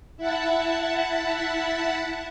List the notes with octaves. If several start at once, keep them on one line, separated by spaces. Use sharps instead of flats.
E4 E5 F#5 A5